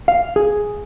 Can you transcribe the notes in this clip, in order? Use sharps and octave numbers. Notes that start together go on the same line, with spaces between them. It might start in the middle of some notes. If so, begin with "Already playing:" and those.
F5
G#4